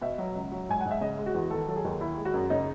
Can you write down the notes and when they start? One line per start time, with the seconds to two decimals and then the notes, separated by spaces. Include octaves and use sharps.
0.01 B2 E5
0.18 F#3
0.35 C#2
0.52 F#3
0.69 G#2 G#5
0.81 G#2 F#5
0.91 E5
1.01 C#3 D#5
1.18 G#3
1.26 F#4
1.35 E2
1.51 D#3 A4
1.68 F#3 A4
1.76 G#4
1.85 D#2
2.01 D#3 E4
2.18 G#3
2.25 F#4
2.34 F#2
2.50 C#3 D#4